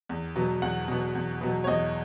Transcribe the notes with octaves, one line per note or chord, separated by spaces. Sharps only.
E2
B2 F#3 B3
E2 F#5
B2 F#3 B3
E2
B2 F#3 B3
C#5
E2 D#5